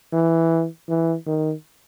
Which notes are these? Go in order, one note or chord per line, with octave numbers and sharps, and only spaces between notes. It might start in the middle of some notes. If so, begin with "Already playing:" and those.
E3
E3
D#3